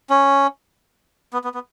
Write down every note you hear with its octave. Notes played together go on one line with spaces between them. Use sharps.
C#4
B3
B3
B3